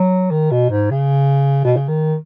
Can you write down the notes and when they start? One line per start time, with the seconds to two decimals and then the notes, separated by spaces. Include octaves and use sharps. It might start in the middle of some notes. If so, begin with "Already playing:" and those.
Already playing: F#3
0.31 D#3
0.51 B2
0.70 G#2
0.90 C#3
1.64 B2
1.77 C#3
1.88 D#3